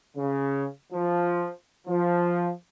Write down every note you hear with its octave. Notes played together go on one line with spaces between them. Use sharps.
C#3
F3
F3